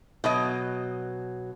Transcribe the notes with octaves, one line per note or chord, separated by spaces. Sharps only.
B2 F#3 D#5